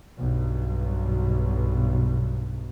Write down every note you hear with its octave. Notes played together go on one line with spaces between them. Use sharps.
B1 G2 B2